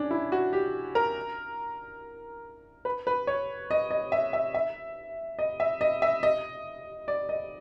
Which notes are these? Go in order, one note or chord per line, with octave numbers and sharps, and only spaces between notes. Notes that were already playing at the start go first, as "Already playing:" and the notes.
Already playing: C#4 D4
E4
F#4
G4
A#4
B4
B4
C#5
D#5
D#5
E5
E5
E5
D#5
E5
D#5
E5
D#5
D5
D#5